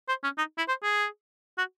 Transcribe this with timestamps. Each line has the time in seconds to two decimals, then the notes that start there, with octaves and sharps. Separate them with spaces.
0.08 C5
0.23 C#4
0.38 D#4
0.58 E4
0.68 C5
0.83 G#4
1.58 F#4